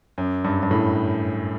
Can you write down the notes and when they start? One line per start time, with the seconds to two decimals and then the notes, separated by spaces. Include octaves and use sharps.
0.18 F#2
0.44 G2
0.63 G2
0.71 A2